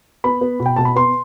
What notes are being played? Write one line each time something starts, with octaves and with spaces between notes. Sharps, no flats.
B3 B5
B3
B2
G5
B2 A5
B5
B3 C6